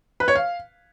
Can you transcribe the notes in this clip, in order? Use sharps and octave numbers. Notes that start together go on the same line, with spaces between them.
B4
C#5
F5